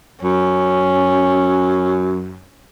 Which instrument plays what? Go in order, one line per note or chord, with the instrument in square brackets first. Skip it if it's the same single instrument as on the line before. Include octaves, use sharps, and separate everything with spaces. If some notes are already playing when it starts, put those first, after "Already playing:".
[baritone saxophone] F#2 [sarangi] C#4